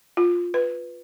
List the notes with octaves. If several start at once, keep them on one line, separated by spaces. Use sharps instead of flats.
F4
B4